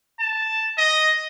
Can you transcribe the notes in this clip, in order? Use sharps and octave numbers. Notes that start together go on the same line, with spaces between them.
A5
D#5